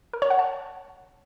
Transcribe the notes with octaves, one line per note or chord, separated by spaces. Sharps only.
A#4
C#5
F#5
A5